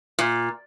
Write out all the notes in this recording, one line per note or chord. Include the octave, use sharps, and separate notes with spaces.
A#2